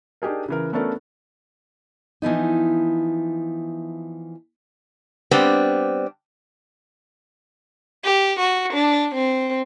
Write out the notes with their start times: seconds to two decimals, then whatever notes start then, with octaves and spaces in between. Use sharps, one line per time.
0.22 D4 D#4 G4 G#4 A#4
0.48 C#3 E3 A#4
0.73 A3 B3 C#4 D4 A4 A#4
2.22 E3 F3 B3 D#4
5.31 G3 B3 C4 D4
8.05 G4
8.40 F#4
8.74 D4
9.15 C4